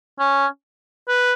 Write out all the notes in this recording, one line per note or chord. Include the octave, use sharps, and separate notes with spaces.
C#4
B4